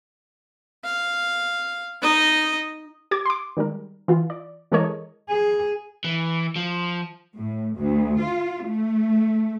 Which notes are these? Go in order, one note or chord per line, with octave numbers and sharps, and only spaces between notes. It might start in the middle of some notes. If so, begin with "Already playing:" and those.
F5
D#4 D#5
G4 D6 G#6 A6
C6 D6
D#3 G3 G#3 A#4
E3 F4
D5
E3 G#3 A4 A#4 C#5 D#5
G#4
E3
F3
A2
D2
F4
A3